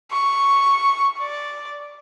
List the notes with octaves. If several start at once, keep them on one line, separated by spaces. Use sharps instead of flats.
C#6
D5